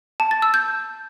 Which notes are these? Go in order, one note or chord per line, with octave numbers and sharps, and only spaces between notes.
A5
A6
E6
G6